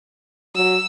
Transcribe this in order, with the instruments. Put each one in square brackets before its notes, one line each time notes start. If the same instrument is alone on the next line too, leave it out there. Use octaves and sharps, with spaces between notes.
[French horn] F#3 [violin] E6